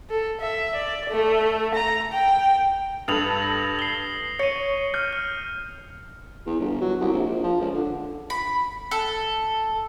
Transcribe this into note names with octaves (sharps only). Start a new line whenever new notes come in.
A4
E5
D5
A3
A#5
G5
G2 A4 D#6 F7 F#7
A#6
C7 G7
C#5 C#7 D#7
F6 G6
F6
E2
G1
F#3
C2
A#1
A#1
F3
C#2
D3
B5
A4